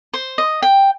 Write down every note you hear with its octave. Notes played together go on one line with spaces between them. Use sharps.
C5
D#5
G5